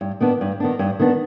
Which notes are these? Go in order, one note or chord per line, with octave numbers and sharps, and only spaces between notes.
G2
D#3 B3 D4
G2
D#3 B3 D4
G2
D#3 B3 D4